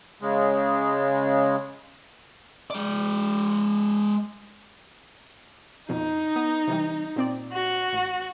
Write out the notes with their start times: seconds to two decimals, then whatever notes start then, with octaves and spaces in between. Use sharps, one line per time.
0.22 C#3 G#3
2.70 G#3 D5
5.89 F2 B2 D#4
6.36 B3 D#6
6.67 C3 E3 G3
7.16 A#2 C4 D5
7.53 F#4
7.93 A1